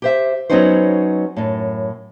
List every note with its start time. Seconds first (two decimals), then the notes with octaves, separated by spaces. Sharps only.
0.02 G4 C5 E5
0.50 F#3 B3 C#4 D#4 F#4 C5
1.37 F#2 A2